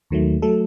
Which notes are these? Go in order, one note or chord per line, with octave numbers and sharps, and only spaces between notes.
D#2 D#3 F#3 A3
F#3 A3 A4